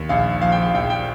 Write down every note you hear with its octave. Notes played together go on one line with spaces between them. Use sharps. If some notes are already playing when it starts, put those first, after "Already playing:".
Already playing: D#2
A#1 F5
F3 F5
G5
F5
A#1 G5
G5